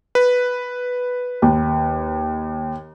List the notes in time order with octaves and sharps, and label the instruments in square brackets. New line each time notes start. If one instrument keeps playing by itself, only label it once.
[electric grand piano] B4
[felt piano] D#2